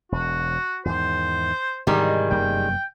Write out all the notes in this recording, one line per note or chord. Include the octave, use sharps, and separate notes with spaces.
E1 F#4
E2 G#2 D#3 C5
G#2 C3 D#3 E3 G3 G#3
F1 F#2 A#3 G5